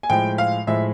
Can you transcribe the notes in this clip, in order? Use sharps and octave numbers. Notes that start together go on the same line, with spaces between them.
G#5
A2 F3 G#3 G5
F5
A2 F3 G#3 E5